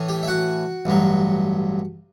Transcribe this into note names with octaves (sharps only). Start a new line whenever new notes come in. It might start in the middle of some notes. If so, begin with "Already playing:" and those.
Already playing: A2 E3 A3 C#4
G4
E5
F#4 F#5
A1 G2 F#3